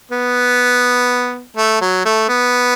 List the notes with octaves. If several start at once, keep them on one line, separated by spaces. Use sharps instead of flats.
B3
A3
F#3
A3
B3